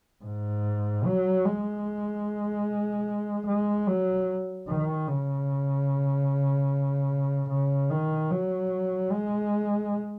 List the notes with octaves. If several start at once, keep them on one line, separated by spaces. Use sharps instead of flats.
G#2
F#3
G#3
G#3
F#3
D#3
C#3
C#3
D#3
F#3
G#3